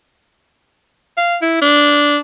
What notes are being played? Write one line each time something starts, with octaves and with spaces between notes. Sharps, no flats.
F5
E4
D4